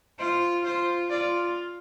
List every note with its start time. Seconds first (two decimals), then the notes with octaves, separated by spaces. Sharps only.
0.19 F4 C5
0.65 F4 C5
1.10 F4 D5